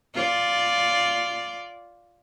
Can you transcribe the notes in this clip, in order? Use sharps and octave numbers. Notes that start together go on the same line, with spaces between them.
F4 D5